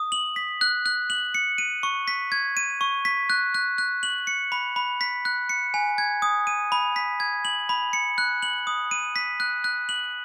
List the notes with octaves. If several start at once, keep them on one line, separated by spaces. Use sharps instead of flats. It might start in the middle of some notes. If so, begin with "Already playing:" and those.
Already playing: D#6
F#7
B6
F#6
F#6
F#7
C#7
D#7
C#6
B6
G#6
D#7
C#6
B6
F#6
F#6
F#6
F#7
C#7
B5
B5
B6
F#6
C#7
G#5
G#6
D#6
D#7
B5
B6
G#6
F#7
B5
C#7
F#6
F#7
D#6
D#7
B6
F#6
F#6
F#7